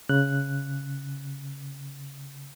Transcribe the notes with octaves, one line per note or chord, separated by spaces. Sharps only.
C#3 F#6